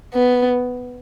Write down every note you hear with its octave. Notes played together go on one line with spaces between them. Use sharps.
B3